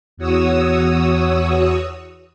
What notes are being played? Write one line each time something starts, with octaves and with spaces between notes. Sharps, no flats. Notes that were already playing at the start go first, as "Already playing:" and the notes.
E2 F#4 C#5 D#6 E6